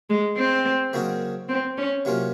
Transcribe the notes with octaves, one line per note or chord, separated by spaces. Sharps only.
G#3
C4
C#3 F#3 A#3 D#4 F#4
C4
C#4
C3 F#3 A#3 C#4 F4